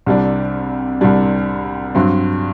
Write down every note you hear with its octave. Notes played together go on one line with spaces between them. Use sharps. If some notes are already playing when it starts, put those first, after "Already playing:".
C2 C3 G3 D4
C2 C3 G3 D4
G2 F#3 C4